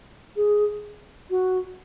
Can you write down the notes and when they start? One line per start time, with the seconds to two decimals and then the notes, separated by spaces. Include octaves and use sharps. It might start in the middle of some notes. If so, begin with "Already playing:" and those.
0.36 G#4
1.30 F#4